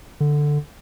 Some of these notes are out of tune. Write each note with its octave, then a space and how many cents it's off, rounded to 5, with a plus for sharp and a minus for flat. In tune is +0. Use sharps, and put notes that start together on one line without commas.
D3 +5